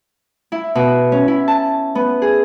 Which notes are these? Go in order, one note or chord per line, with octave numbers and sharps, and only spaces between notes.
E4
B2
C#4
E4
A5
B3
G#4